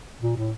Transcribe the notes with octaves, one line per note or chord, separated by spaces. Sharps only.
A#2
A2